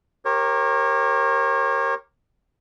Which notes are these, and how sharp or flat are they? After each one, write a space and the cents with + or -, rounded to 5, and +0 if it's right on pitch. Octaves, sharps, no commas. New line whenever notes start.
G4 +0 A#4 +0 C#5 -35